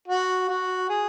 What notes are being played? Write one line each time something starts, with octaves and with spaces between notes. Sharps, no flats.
F#4
F#4
G#4